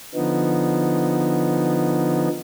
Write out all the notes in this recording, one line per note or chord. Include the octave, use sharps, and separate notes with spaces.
D3 F3 B3 D#4